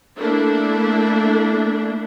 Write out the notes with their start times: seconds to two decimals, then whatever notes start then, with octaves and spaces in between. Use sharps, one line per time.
0.17 A3 A#3 D4 E4